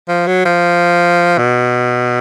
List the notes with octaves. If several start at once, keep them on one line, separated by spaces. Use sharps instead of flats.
F3
F#3
F3
B2